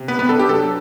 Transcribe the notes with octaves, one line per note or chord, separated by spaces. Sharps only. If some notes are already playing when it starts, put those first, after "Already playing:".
Already playing: C3
B3 B4
B3 B4
D4 A4
G4
F#3 A4